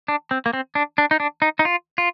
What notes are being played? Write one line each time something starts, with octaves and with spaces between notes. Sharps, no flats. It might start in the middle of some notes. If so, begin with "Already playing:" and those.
D4
C4
A#3
C4
D4
D4
D#4
D4
D#4
D#4
F4
F4